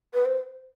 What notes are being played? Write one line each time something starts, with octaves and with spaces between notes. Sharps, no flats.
B4
C5